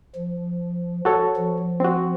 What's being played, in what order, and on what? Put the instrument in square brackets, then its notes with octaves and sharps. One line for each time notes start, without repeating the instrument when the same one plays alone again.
[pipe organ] F3
[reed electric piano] F#4 A4 C#5
[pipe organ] F3
[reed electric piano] C4 F#4